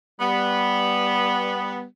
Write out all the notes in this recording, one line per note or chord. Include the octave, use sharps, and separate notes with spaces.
G3 B3